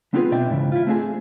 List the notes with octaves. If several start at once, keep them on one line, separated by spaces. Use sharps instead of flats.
B3 C4 D4 F4 G#4 B4
B2 C4 D4 D5 E5 G5
G#2 C#3 E3
E4 F4
A3 C4 D4 E4 G#4